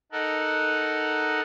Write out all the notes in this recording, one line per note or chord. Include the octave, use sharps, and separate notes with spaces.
D#4 A4 A#4 F#5